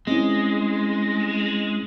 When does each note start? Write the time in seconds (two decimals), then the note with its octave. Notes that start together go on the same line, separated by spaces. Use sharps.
0.07 G#3 C4 C#4 E4